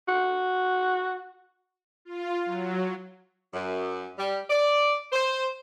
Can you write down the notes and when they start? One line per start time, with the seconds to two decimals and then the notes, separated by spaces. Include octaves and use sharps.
0.08 F#4
2.05 F4
2.46 F#3
3.54 F#2
4.17 G3
4.50 D5
5.13 C5